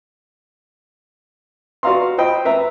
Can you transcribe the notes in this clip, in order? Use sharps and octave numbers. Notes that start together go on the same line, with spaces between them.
F#4 B4 D5 F5 A#5 C6
C5 D#5 G5 B5
B4 E5 A#5